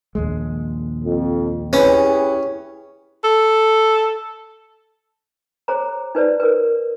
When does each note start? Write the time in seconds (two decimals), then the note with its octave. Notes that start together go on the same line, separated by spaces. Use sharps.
0.15 A#1 D#2 G#3
1.04 F2
1.73 C#4 E4 G4 G#4 B4 C#5
3.24 A4
5.68 G#4 C5 C#5 A#5
6.15 D#4 B4 C5 D5
6.40 A#4 B4